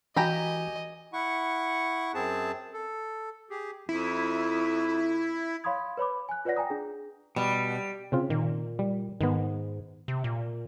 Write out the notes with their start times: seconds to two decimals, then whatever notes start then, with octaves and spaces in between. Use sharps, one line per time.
0.16 E3 F#4 G4 D#5 G#5 A#5 B5
1.13 E4 F#5 C#6
2.15 F#2 C4 G#4 A5
2.73 A4
3.50 G4 G#4
3.89 F2 E4
5.64 C#5 F5 B5 C6 D#6 G#6
5.97 B4 C#5 B5 D6
6.29 G#5 F#6
6.45 F4 B4 C#5 D5 F#5 A#6
6.56 G5 G#5 A#5 D#6
6.70 D4 G#4
7.36 B2 G3
8.12 C#3 C4 F4
8.30 A#2 D#3
8.79 G3
9.21 G#2 D#3 B3
10.08 C3
10.24 A#2